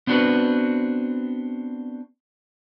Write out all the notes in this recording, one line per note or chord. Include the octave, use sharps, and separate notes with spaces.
B3 C4 D4 F#4 B4